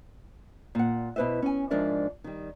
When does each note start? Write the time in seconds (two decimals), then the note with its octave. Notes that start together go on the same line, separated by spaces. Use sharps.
0.75 A#2 F#5
1.16 B2 E4 B4 C5 E5
1.42 C#4 G#5
1.70 G#2 F3 D4 A#4 D5 E5
2.24 D#3 G3